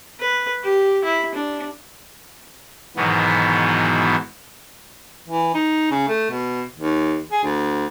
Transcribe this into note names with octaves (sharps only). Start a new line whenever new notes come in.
B4
G4
E4
D4
G#2 B2 D#3 E3 F#3 B3
E3
D#4
C#3
A3
B2
D#2
G#4
D2